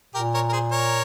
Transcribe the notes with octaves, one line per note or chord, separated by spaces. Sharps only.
A#2 G4 A#4
A#4 C#5
A#4
G#4 C5
A#4 C#5